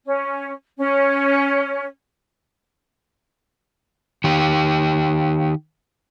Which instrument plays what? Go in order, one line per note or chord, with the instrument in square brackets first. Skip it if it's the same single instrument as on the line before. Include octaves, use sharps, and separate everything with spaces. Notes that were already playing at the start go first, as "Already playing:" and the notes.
[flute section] C#4
C#4
[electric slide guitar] D#3 G4